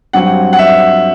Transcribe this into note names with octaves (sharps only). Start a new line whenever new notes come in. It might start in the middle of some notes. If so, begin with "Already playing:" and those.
G2 F#3 C4 F#5
F#5
E5